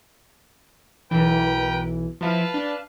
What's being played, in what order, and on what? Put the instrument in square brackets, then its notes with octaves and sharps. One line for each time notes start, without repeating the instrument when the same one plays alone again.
[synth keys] B1 E3 [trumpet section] A#4 B4 G5
[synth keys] F3 E4 [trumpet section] B4 F5 A5
[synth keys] D4